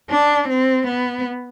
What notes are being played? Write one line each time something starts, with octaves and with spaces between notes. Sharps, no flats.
D4
C4
B3